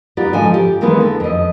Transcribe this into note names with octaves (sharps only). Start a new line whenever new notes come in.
B3 D#4 F4 G4 D5
G#2 D3 F3 G#5
G4
D#3 E3 G#3 A#3 B3 E4
D3
F2 D#5